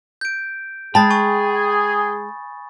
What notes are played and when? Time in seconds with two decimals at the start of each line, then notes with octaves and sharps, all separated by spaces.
0.21 G6 D7
0.95 G#3 G#4 G5 A5 B5 A6
1.10 G#5 C#6 D#6